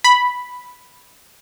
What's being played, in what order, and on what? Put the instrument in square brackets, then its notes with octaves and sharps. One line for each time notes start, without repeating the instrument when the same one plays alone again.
[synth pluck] B5